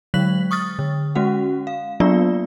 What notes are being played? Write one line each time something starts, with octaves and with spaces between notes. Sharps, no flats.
D3 F#3 G#3 F#6 B6 F#7
C#6 D#6 F6 A6
D3
G#3 C#4 F#4 F#5
F5
F#3 A#3 B3 D4 F4 D5